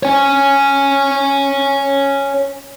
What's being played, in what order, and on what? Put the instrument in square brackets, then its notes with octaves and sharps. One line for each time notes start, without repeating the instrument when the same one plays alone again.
[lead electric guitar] C#5 G#5